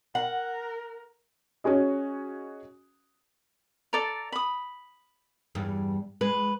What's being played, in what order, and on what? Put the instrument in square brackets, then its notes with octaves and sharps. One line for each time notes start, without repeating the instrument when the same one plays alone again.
[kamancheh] A#4 [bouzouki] F#5
[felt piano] C#4 F#4 G#4 D#5
[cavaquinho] A4 D5 A#5
B5 D#6
[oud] E2 G2
[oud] G#3 [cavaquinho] B4